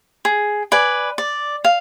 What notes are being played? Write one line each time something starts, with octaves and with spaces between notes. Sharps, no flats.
G#4
B4 D5 G#5
D5
F5